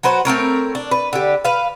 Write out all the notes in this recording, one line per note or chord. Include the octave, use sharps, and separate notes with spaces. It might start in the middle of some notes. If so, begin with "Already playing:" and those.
F#3 F#4 B4 C5
A3 C4 A#4 C#5
D4
B4
D3 G4
B4 F5